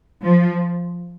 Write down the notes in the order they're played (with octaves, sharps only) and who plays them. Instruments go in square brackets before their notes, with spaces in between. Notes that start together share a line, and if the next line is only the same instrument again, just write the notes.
[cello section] F3